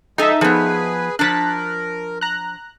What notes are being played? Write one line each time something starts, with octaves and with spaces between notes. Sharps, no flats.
F3 G#3 D#4 A4 E5 G#5
F3 B3 G#4 B4
F3 D4 A#4 F#6 A6 B6
A#5 F#6